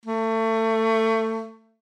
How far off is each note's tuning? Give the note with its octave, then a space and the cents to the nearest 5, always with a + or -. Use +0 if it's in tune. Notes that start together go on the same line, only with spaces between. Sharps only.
A3 +25